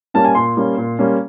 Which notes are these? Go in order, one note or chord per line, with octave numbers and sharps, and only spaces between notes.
G3 A#3 C#4 A5
G#5
A#2 C6
G3 A#3 C#4
A#2
G3 A#3 C#4